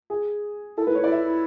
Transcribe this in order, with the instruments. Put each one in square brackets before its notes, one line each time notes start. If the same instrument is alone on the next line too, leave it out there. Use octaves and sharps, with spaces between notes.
[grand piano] G#4
[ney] E4 [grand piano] A4
[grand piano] B4
[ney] E4
[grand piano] C#5
[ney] E4 [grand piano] D5
[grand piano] E5